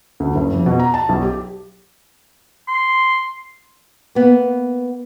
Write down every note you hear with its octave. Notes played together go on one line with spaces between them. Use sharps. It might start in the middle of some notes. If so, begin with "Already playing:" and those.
D2
F#1
F2
B2
A#5
A5
B1
G4
C6
A#3 B3